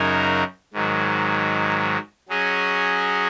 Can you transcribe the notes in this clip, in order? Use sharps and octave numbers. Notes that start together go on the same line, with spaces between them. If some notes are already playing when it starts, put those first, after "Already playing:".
Already playing: F#2 C#3 F#3 D#4 A#4
G#2 D#3 F#3
F#3 C#4 G#4 D#5